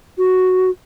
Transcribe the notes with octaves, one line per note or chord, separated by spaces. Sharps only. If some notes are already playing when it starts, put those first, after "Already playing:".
F#4